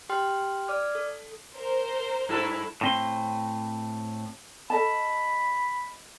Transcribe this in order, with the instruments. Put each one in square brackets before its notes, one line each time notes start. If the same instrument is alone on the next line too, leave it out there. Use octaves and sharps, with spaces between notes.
[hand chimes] G4 G5 C6 F6
D5 D6 F6
A4
[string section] A#4 C5
[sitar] G2 E4 A4
[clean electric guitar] A2 C4 C6
[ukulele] A4 D#5 A5 [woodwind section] B5